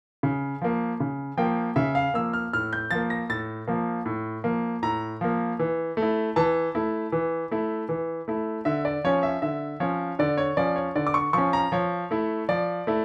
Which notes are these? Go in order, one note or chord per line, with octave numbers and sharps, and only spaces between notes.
C#3
F3 A#3
C#3
F3 A#3 G5
C#3 E5
F5
F3 A#3 E6
F6
A2 F6
G6
F3 A#3 A6
A#6
A2 A6
F3 A#3
A2
F3 A#3
A2 A#5
F3 A#3
E3
A3
E4
E3 A5
A3 E4
E3
A3 E4
E3
A3 E4
D3 E5
D5
F3 C#4 C#5
E5
D3 E5
F3 C#4 C#5
D3 D5
C#5
F3 C#4 D5
C#5
D3 D5
D6
C#6
F3 C#4 C#6
A#5
F3 C#5
A3 E4
F3 D5
A3 E4